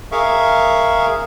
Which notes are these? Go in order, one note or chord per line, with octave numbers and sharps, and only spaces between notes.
G#4 A#4 E5 F5 C#6